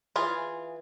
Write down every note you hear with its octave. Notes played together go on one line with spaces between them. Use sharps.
E3 F4 G#4